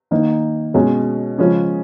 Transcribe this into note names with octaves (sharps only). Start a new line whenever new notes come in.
D#3 A#3 D#4
B2 G#3 C#4
C#3 F3 G#3 C#4